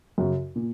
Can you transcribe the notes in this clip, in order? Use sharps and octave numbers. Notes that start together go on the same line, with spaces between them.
F#2 C#3 F#3
A#2